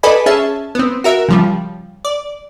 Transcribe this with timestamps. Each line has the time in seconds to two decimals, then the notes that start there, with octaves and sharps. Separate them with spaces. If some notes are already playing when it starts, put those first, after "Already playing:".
0.03 A4 B4 D5 D#5 G#5 B5
0.26 C#4 G#4 E5 A5
0.75 B3 C4
1.04 F#4 A#4 E5
1.29 C#3 F3 G3
2.05 D5